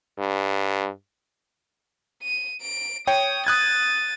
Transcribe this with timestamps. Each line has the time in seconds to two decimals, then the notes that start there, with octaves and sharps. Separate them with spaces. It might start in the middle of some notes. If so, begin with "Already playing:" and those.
0.19 G2
2.22 D#7
2.61 D7
3.07 C#5 G5 D#6
3.47 D#6 F#6 G#6 A6 D#7